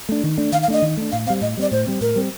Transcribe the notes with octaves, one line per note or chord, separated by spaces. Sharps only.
A3 D4
D#3
A3 D4
D#3 F5
F5
A3 D4 D#5
D#3
A3 D4
A2 F5
G3 C4 F5
A2 D#5
G3 C4 D5
A2 C5
G3 C4
A2 A#4
G3 C4